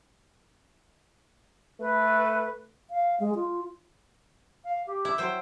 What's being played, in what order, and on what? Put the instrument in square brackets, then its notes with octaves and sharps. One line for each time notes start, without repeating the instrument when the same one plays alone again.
[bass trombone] A3 [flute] B4
[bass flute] F5
G#3
F4
F5
G4
[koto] E4
[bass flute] F#3 [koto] C5 G5